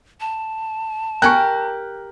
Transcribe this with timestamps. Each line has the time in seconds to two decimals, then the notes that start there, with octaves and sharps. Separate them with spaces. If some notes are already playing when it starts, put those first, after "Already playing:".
0.20 A5
1.22 G4 A#4 G5 G#5 C#6 F#6